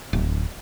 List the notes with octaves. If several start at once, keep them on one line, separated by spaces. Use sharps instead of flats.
D1